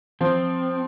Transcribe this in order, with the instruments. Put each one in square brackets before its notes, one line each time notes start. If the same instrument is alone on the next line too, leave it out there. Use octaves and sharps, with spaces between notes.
[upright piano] F3 [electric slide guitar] C4